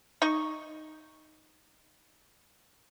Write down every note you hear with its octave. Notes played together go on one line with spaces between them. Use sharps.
D#4 D#5 C#6